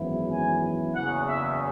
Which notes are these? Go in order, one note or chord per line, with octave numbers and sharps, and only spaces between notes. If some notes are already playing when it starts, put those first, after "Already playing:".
Already playing: G#1 F#2 E3 B3 E4
G#5
F#1 E2 C#3 F#5
E5